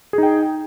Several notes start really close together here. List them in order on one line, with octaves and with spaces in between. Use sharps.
G#4 D#4 G5